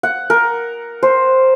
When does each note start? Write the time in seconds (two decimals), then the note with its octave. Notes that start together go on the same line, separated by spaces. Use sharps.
0.03 F#5
0.30 A#4
1.03 C5